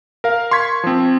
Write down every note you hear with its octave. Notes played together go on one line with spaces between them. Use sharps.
A#4 F5
C6 C#6 G#6 B6
F3 C4